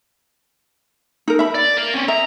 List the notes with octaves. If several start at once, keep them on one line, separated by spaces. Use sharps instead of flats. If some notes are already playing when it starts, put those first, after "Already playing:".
D#4 A#4
E5 B5
D5
A#4 F5
C4 C#4
D#5 E5 A#5